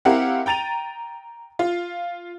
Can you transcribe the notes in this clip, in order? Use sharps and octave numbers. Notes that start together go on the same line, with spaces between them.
C4 E4 G4 A#4 F5 F#5
G5 A#5 A6 D#7 F7
F4